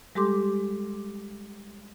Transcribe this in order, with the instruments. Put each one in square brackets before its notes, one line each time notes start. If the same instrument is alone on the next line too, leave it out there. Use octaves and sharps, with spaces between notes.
[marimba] G3 G#3 G4 A4 C6 D6